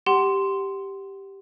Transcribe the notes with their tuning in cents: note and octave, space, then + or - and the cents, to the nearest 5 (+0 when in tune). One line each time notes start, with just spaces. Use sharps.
G4 +0 F#5 +30 C6 -5